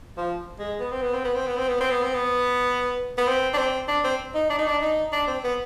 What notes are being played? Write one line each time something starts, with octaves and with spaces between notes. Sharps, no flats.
F3
G#3
B3
C4
B3
C4
B3
C4
B3
C4
B3
C4
B3
C4
B3
B3
C4
D4
C4
D4
C4
D#4
D4
D#4
D4
D#4
D4
C4
B3